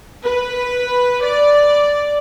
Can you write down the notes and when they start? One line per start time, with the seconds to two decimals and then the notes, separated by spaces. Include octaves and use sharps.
0.25 B4
1.24 D5